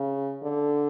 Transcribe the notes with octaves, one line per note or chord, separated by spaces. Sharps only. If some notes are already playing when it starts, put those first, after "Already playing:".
Already playing: C#3
D3